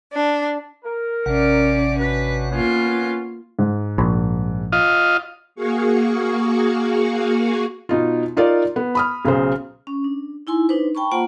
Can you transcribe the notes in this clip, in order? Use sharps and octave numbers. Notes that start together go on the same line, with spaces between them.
D4
A#4
A1 C3 C#4 D5 F#5
C#4 D4 F#4 B4
A#3 B3 C#4 F4
G#2
A#1
F4 D#5 F5
A#3 F#4 G#4 F5 C#6
B2 D#4 F4
D#4 F4 A#4 D5 F5
B3
B5 D#6 F6
B1 C#3 C5
C#4
D4
D#4 E4 G#5 C6
D4 D#4 B4 C5
G5 A5 B5 C#6
A#3 F4 C5 F#5 A#5